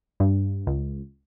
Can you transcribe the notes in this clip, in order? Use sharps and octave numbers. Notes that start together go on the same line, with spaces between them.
G2
C#2